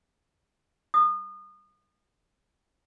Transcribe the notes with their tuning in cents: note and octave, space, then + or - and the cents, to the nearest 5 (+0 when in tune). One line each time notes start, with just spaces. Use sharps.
D#6 -30